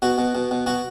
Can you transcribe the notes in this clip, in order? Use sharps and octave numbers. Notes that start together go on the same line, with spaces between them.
B2 F#4
B2
B2
B2
B2 F#4